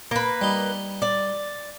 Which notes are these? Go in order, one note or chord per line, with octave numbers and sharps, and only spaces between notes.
A#3 B4
G3 D#4
D5